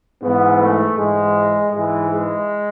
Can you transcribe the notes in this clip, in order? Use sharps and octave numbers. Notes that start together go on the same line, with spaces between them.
G#2 E3 B3
A3
G#2 E3 G#3
G#2 E3 G#3
G#3